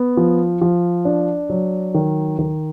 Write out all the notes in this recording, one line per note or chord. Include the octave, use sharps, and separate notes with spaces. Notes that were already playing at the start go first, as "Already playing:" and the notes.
Already playing: B3
F3
F3
D4
F#3
D#3
D#3